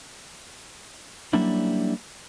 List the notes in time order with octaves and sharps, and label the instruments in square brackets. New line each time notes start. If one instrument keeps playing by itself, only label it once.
[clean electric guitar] F#3 G3 A#3 C#4 D4 E4